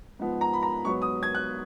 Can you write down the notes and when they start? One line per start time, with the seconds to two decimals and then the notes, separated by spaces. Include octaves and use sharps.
0.19 G#2 F3 B3
0.41 A#5
0.53 B5
0.63 A#5
0.85 G#2 F#3 B3 C#6
1.02 D#6
1.23 G#6
1.35 F#6